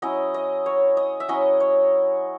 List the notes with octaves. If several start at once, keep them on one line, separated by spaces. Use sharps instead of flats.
F#3 C#4 E4 D#5
D#5
C#5
D#5
E5
F#3 C#4 E4 D#5
C#5